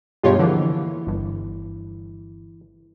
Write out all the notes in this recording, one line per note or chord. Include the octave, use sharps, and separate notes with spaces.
G2 B2 G#3 F4 G4 C#5
D3 E3 F3 A#3
G1